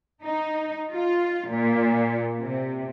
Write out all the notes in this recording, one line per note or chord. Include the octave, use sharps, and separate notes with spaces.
D#4
F4
A#2
C3